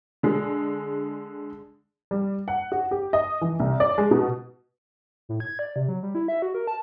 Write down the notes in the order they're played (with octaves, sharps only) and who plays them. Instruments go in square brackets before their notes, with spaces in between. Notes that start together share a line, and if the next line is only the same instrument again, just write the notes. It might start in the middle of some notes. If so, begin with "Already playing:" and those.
[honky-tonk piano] D3 G#3
G3
F#5
F#4
G4
D#5
E3
C2
D5
G#3
B2
[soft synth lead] A2
G#6
D5
C3
F#3
G3
E4
E5
F#4
A#4
A5